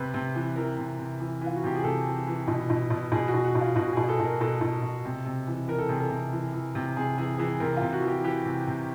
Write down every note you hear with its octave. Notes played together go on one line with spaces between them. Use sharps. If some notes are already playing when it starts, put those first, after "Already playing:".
Already playing: C3 B4
C3
E3
E3 A#4
C3
C3
E3
E3 F4
F#4
C3 G4
G#4
C3 A4
E3
E3
B2
B2
B2
B2 G#4
F#4
B2
F#4
B2
F4
B2 F#4
B2 G#4
A4
B2 A#4
B2 A4
B2
B2
C3
C3
E3
E3 A#4
A4
C3 G#4
A4
C3
E3
E3
C3
C3 G#4
E3 G#4
E3 G#4
C3 A#4
C3 F4
F#4
E3
G4
E3 G4
C3
C3